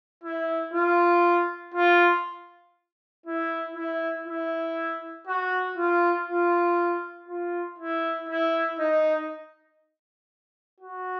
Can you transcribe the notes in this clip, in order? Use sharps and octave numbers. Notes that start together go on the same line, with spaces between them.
E4
F4
F4
E4
E4
E4
F#4
F4
F4
F4
E4
E4
D#4
F#4